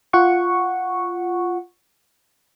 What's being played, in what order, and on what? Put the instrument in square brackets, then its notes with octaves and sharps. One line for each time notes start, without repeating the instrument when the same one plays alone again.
[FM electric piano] F4 F#5 C#6